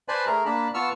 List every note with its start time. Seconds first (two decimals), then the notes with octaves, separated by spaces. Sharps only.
0.08 B4 C5 D5 G#5 A5 B5
0.26 A3 G#4 A#4 A#5
0.45 A#3 D4 A5 B5
0.74 B3 F4 A5 C#6 E6 F6